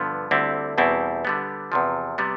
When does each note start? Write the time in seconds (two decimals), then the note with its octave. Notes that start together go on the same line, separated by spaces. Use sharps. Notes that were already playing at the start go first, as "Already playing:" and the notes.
Already playing: G2 D3 F3 B3
0.31 D2 D3 G3 C4 E4
0.78 E2 B2 G3 C4 E4
1.25 D3 G3 B3
1.72 E2 C3 F3
2.18 C3 G3 B3